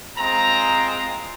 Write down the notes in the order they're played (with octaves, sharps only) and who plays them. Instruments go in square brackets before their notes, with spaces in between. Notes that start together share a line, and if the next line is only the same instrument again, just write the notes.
[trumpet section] G#3 C4 F4 A#5